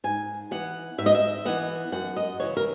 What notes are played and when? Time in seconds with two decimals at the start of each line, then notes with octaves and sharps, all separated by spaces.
0.04 G#2 G#5
0.51 E3 B3 F#5
0.98 G#2 E5
1.06 D#5
1.15 E5
1.45 E3 B3 F#5
1.92 F#2 F#5
2.16 D#5
2.40 C#3 E3 C#5
2.57 A#4